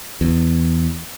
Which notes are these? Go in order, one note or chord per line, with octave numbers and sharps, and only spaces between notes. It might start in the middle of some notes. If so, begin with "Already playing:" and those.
E2